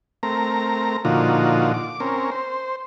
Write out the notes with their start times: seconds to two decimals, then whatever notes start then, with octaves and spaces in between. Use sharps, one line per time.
0.23 A3 C4 A#4 A#5
1.05 A#2 D3 F3 D#4 F4 F#4
1.74 D6
2.00 C4 C#4 A#4
2.32 C5